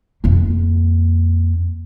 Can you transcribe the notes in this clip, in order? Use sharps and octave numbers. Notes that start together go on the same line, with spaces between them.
F2 A#3